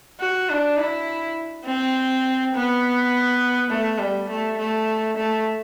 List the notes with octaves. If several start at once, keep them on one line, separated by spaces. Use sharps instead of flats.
F#4
D4
E4
C4
B3
A3
G3
A3
A3
A3